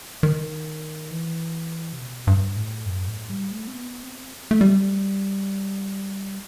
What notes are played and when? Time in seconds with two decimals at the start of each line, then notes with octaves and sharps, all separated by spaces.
0.23 D#3
1.11 E3
1.93 C3
1.98 B2
2.27 G2
2.56 A2
2.86 F#2
3.07 A2
3.30 G3
3.51 A3
3.67 C4
3.73 B3
4.03 C4
4.51 A3
4.61 G3